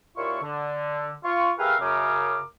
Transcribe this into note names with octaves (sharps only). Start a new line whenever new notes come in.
D#2 A#2 E4 F4 C#6
D3
F4 C#6
G4 G#4 A#4 B4 E5 F5
F#2 C#3 A#4 D6